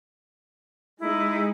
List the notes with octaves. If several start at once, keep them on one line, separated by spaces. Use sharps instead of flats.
G#3 D#4 E4